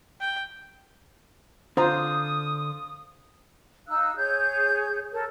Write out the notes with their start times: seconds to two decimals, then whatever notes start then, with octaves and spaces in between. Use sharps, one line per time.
0.21 G5
1.77 D3 F4 C5 A#5 D#6
3.88 D#4 F5 E6 F#6
4.16 G#4 C#5 G6
5.13 A4 A#4 C#5